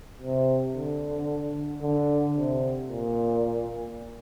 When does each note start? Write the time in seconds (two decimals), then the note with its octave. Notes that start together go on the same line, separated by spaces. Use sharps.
0.20 C3
0.74 D3
1.82 D3
2.36 C3
2.90 A#2